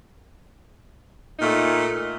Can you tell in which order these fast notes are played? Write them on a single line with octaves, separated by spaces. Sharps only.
D#4 A#2 A3